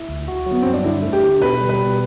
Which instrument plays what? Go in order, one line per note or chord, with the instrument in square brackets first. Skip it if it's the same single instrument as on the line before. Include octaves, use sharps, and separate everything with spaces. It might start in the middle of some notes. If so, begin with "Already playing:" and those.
Already playing: [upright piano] E4
[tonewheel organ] D2
F#4
[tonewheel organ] F#3 [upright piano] B3
[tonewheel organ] G2 [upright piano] C4
[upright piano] D4
[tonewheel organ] D3 [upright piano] E4
[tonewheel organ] A3
[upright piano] G4
[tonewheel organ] D3
[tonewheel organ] B2 [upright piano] B4
[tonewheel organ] G3
[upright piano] B4
[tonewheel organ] B2